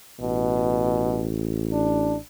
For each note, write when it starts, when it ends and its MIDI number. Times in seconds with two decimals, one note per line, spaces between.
0.21 2.17 33
0.21 1.29 47
1.73 2.17 62